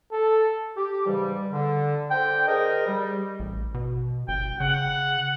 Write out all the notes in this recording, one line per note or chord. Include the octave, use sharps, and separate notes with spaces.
A4
G4
G#2 C#3 E3 G3
D3
D3 C5 G5
G#4 A#4 C5 D#5
G3
A1
B2
G1 G5
C#3 F#5